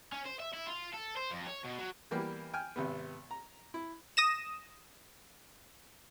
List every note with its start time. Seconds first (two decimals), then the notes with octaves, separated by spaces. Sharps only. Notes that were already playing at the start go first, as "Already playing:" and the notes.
0.12 C#4
0.26 C5
0.40 E5
0.54 E4
0.67 F4
0.94 A4
1.17 C5
1.31 F2
1.46 C#5
1.64 B2
1.78 F#3
2.11 E3 G3 A#3 B3 G4
2.53 G5 G#5 F6
2.76 G#1 C3 B3
3.31 A#5
3.74 E4
4.17 D#6 A#6 E7